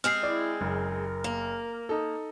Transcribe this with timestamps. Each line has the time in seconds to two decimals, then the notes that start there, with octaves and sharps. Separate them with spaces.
0.04 G#3 C4 G#4 F6 C7
0.23 E4 D5
0.61 F#1 A#4
1.24 A#3
1.89 D#4 A4